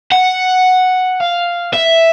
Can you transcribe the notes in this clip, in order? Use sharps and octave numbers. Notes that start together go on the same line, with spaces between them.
F#5
F5
E5